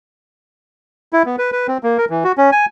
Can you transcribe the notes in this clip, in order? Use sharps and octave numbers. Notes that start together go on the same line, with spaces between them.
E4
B3
B4
B4
C4
A#3
A#4
E3
F#4
C#4
G#5